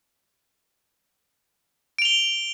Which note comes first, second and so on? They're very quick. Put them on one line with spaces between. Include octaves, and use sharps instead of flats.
D7 F7 G7